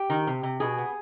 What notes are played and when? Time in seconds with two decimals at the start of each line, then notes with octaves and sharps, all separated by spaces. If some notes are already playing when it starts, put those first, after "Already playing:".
Already playing: G4
0.10 D#3
0.27 C3
0.43 C3
0.60 B2 G#4
0.78 B3